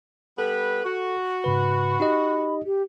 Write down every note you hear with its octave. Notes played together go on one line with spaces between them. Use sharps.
G3 B3 A4 B4
F#4
G#2 C#3 B4 B5
D#4 G4 D#5
G4